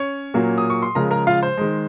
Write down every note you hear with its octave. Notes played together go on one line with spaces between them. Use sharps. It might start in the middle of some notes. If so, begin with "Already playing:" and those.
Already playing: C#4 C#5
A#2 F#3 A#3
D#6
C#6
C6
C#3 F3 G#3 A#4 A#5
A#4 A#5
F4 F5
C5
D#3 G#3